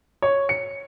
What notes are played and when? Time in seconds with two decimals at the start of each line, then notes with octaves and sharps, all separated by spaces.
0.22 C#5
0.49 C#7